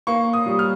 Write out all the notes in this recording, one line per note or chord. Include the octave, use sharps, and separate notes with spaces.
A#3 C#6
D#6
G3
F6